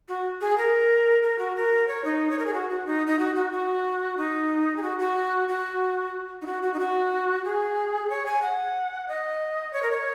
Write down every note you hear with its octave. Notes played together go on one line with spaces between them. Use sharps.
F#4
G#4
A#4
A#4
F#4
A#4
C#5
D#4
C#5
A#4
G#4
F#4
F#4
D#4
D#4
F#4
F#4
F#4
D#4
G#4
F#4
F#4
F#4
D#4
F#4
F#4
D#4
F#4
G#4
C#5
G#5
F#5
D#5
C#5
A#4
C#5